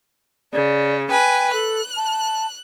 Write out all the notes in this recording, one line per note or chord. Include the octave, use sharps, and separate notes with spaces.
C#3 D5
B4 G5 G#5
A4 F#6
A5